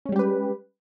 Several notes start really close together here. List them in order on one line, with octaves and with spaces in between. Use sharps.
C#4 G#3 G3 G4 B4